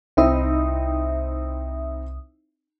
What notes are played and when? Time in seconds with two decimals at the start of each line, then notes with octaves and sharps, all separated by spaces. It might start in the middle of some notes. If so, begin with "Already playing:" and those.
0.17 C2 C4 D#4 E4 E5 D#6